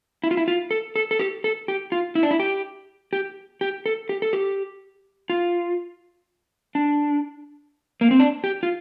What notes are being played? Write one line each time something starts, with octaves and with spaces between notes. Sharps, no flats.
E4
F4
E4
F4
A4
A4
A4
G4
A4
G4
F4
E4
D4
E4
G4
G4
G4
A4
G4
A4
G4
F4
D4
A#3
C4
D4
G4
F4